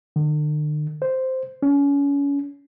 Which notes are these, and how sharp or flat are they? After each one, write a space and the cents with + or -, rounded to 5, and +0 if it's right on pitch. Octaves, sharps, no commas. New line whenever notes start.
D3 +45
C5 -5
C#4 +30